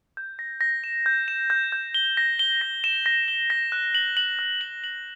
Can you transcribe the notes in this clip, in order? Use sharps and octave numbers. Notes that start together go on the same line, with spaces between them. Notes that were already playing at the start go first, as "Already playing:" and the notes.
G6
A#6
A#6
E7
G6
E7
G6
G6
G7
A#6
G7
A#6
E7
A#6
G7
A#6
F#6
F#7
F#7
F#6
F#7
F#7